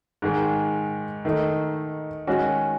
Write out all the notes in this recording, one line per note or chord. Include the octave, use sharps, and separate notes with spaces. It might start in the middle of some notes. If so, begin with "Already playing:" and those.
G#2 D#3 G#3
D#3 A3 D#4
D#3 G#3 C#4 F#4